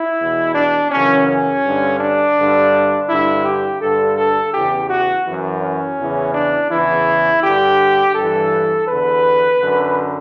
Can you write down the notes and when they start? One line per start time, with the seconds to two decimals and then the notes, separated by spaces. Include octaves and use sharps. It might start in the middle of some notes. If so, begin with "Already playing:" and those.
Already playing: E4
0.19 E2 B2
0.55 D4
0.91 F#2 C#3 E3 C#4
1.28 C#4
1.64 G2 D3
2.01 D4
2.37 G2 D3
3.08 G2 D3 E4
3.45 G4
3.81 G2 D3 A4
4.18 A4
4.54 E2 C#3 E3 G4
4.90 F#4
5.26 F#2 E3
5.62 C#4
5.98 E2 C#3 E3
6.35 D4
6.71 E2 C#3 E3 E4
7.44 G2 D3 G4
8.15 G2 A4
8.21 E3
8.88 E2 D3 B4
9.61 F#2 D3